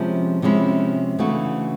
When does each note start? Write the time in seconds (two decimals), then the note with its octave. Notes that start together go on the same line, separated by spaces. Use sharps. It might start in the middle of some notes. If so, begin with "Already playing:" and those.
Already playing: C3 F3 G#3 C#4 E4
0.42 C3 F3 G#3 C#4 E4
1.19 C#3 E3 A3 D4 F#4